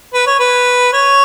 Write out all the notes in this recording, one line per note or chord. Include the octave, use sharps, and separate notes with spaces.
B4
C#5
B4
C#5